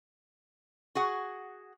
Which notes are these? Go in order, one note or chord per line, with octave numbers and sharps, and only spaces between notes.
F#4 G#4 F#5